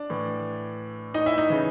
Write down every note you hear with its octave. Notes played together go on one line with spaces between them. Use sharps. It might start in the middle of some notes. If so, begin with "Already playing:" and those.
Already playing: D4 D5
A2 E3
D#4 D#5
E4 E5
D#4 D#5
C#3 E3